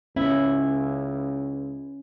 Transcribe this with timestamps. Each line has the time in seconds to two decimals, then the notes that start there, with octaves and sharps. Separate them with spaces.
0.16 C#2 C#4 E4